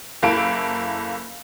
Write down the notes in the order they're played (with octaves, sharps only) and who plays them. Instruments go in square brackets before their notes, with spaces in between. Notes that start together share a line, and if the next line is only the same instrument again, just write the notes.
[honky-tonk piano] F#1 A#3 E4 A4 B5 D7